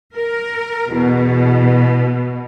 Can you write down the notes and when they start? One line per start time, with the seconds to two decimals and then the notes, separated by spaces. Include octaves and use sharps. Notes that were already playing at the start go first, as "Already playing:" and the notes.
0.14 A#4
0.91 E2 B2